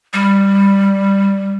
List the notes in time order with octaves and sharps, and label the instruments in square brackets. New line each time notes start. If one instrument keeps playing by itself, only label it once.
[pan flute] G3